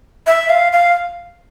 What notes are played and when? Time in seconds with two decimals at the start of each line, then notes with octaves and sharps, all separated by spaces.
0.27 E5
0.49 F5
0.73 F5